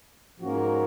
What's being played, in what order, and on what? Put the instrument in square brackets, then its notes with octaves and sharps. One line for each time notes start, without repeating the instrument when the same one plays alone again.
[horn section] G#2 F3 A#3 C#4 F#4